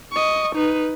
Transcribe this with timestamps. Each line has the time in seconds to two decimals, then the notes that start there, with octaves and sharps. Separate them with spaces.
0.12 D#5 C#6
0.56 D#4 B4